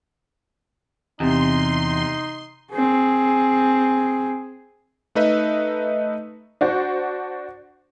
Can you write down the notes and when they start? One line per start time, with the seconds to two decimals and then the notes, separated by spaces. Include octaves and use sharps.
1.20 E2 C3 D#4 C6
2.72 C4 G#4
5.15 A3 D#4 B4 D#5 E5
6.61 D4 F#4 C5